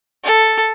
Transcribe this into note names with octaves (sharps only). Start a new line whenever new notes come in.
A4